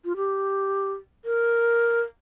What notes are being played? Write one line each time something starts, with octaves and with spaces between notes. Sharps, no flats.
F4
G4
A#4